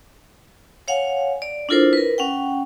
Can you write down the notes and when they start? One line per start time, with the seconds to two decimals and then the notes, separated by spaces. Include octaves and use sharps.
0.88 C#5 F5 F#5 G#5
1.42 D5
1.69 D4 E4 F4 A4 A#4 C5
1.93 A#4 B4
2.18 C#4 F#5 G5